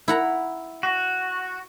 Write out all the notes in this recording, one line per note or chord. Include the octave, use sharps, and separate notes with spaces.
E4 F#5 A#5
F#4